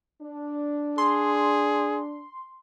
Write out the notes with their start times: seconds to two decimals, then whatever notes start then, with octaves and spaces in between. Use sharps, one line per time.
0.22 D4
0.98 G#4 C6